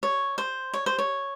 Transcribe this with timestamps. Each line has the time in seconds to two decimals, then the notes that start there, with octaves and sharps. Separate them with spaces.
0.03 C#5
0.38 C5
0.74 C#5
0.86 C5
0.99 C#5